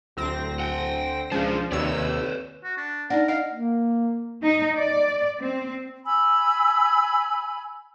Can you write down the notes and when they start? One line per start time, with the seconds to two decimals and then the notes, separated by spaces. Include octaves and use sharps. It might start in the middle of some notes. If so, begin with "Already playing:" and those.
0.17 D1 D2 C4 A#6
0.60 F#5 G5
1.32 C#2 F3 D4 G#4 C5
1.72 D#2 C3 B4 C#5 D5 E6
2.63 F#4
2.77 D4
3.10 D4 D#4 A#4 F#5
3.28 D#5 F5 F#5
3.53 A#3
4.43 D#4
4.76 D5
5.40 C4
6.05 G#5 B5 E6